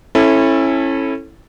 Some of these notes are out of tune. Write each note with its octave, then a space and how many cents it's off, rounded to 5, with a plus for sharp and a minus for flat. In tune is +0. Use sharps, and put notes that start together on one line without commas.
C#4 -30 E4 +0 A4 +0